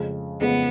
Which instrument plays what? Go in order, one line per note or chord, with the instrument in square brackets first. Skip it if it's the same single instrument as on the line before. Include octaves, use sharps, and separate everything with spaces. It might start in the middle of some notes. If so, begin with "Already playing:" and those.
Already playing: [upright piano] F2 C#3 G#3
[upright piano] F2 C#3 G#3 [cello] B3